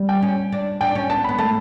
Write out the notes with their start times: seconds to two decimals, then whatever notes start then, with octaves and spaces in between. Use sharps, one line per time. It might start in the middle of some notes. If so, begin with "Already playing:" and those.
Already playing: G3
0.09 G5
0.22 C#4
0.52 D4
0.81 D4 G5
0.95 C#4
1.10 B3 A5
1.24 B5
1.29 B3
1.38 A3 A5